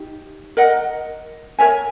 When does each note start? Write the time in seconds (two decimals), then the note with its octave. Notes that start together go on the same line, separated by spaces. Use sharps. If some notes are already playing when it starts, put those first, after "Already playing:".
Already playing: D#4 G4
0.57 A#4 D#5 F#5
1.59 A#4 C#5 E5 G#5